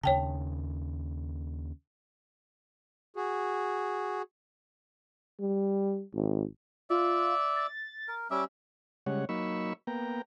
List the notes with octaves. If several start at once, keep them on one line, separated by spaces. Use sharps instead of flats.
D#2 C#3 C#5 G5 A5
F#4 G#4
G3
G#1
F4 D5 E5
A6
A#4
G3 C#4 E5 D6
C#3 G3 G#3 C#5 F#5
F#3 A#3 D#4 B5 C#6 E6
A#3 B3 G5 A#5